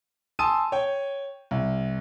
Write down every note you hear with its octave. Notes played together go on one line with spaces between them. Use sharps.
G#5 A5 C6 D#6 E6 D#7
C#5 G5
C2